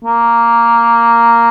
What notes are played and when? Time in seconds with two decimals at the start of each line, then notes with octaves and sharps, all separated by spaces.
0.04 A#3